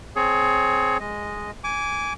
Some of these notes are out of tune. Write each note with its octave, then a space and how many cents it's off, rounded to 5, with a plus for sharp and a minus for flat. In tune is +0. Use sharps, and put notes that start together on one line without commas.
C4 +0 G#4 +25 C#5 +0
G#3 +0 D#5 +0
G#5 +0 D6 -25